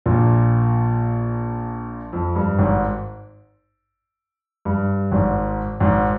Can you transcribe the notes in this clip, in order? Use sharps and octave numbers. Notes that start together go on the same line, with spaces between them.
A#1 A#2
F2
G2
G#1 G#2
G2
G#1 G#2
G#1 G#2